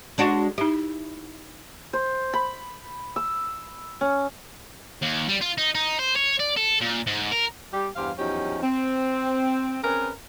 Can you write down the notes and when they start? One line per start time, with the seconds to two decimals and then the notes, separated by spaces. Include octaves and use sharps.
0.18 G#3 D4 F#4
0.58 D#4 E4 G4
1.93 C5
2.33 B5
3.16 E6
4.01 C#4
5.02 D#2
5.29 G3
5.41 F4
5.58 D#4
5.75 D#4
5.99 C5
6.16 C#5
6.39 D5
6.56 A4
6.81 A#2
7.07 G#2
7.32 A#4
7.73 G3 G4
7.96 E2 G2 G4 C5 F5
8.18 E2 F3 F#3 C#4 D#4 G4
8.63 C4
9.83 C4 C#4 G#4 A#4 B4